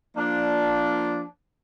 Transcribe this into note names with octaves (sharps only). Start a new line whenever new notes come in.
F3 A#3 D4